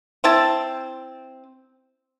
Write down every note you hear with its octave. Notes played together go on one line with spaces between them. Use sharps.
C4 E4 A5